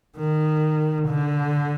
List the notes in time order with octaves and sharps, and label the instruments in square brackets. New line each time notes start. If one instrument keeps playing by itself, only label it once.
[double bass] D#3
D3